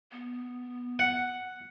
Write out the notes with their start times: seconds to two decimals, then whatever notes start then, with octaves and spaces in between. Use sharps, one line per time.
0.12 B3
0.99 F#5